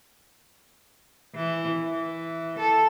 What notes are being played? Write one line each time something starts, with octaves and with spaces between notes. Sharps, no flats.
E3
E3
A4